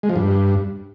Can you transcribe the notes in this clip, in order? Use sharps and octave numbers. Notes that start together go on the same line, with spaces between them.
G#3
F3
G2